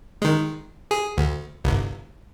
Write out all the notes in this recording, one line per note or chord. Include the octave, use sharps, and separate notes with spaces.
D#3 G#3
G#4
D2
G1 C2